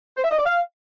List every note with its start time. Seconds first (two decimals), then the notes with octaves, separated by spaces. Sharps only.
0.17 C5
0.24 E5
0.31 D#5
0.38 D5
0.45 F5